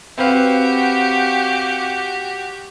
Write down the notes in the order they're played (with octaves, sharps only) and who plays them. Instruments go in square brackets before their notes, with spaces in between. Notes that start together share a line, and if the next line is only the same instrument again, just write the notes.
[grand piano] C4 B4 F5 [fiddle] F#4 G4